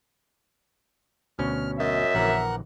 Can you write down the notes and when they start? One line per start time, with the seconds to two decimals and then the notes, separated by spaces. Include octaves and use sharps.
1.39 D2 B2 C#4 F6
1.80 F#2 D#5 E5
2.15 A#1 D3 E3 A#4 F#5 F#6